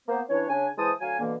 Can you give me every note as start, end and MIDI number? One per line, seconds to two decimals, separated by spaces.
0.08 0.21 58
0.08 0.21 59
0.08 0.21 72
0.30 0.46 52
0.30 0.46 61
0.30 0.46 62
0.30 0.46 73
0.48 0.67 49
0.48 0.67 61
0.48 0.67 62
0.48 0.67 80
0.78 0.91 52
0.78 0.91 56
0.78 0.91 72
0.78 0.91 81
0.78 0.91 87
1.00 1.19 38
1.00 1.19 54
1.00 1.19 77
1.00 1.19 80
1.20 1.35 47
1.20 1.35 50
1.20 1.35 52
1.20 1.35 58